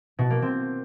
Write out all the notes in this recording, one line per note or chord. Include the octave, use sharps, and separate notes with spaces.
B2
A#3
C4